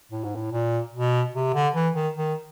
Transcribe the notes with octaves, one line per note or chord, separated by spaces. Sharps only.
A2
G#2
A2
A#2
B2
C3
D3
E3
D#3
D#3